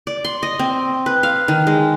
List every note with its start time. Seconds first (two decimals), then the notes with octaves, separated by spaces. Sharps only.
0.07 D5
0.24 C6
0.43 D#5
0.59 C4
1.06 B4
1.23 F5
1.48 D#3
1.67 G#3